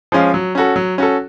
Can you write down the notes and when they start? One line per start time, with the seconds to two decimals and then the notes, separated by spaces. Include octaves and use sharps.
0.12 F3 G#3 C#4 F4
0.34 F#3
0.55 C#4 F#4 A4
0.76 F#3
0.98 C#4 F#4 A4